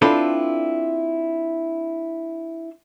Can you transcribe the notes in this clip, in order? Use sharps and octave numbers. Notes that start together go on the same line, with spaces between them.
C4 D4 E4 F4 A4 B4